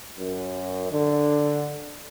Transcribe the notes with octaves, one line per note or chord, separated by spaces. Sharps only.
F#2
D3